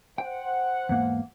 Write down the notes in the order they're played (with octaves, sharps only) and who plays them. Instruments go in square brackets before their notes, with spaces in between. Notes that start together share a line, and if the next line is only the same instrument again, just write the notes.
[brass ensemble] C5 F#5 [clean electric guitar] G5
[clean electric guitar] E2 G#2 A#3